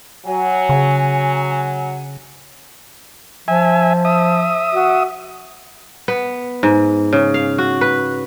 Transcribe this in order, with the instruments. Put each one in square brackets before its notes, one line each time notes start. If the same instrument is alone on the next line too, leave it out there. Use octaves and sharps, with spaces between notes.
[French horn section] F#3 [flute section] G#5
[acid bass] C#3
[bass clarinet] F3 [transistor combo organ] E5 G#5
[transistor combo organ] E5 D#6
[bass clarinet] F#4
[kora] B3
G#2
C#3
F5
F#4
B4